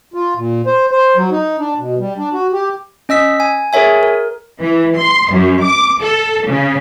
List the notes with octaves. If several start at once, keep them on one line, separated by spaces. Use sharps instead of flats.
F4
A#2
C5
C5
F#3
D#4
D4
B2
G3
D4
F#4
G4
C#4 D#5 E6 B6
G#5
G#4 A#4 C#5 E5 G#5
A#4
E3
C6
F#2
D6
A4
C#3